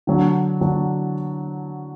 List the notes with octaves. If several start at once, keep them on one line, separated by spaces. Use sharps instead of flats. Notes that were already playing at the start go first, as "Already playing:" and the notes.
D3 F#3 D4
D3 F#3 D4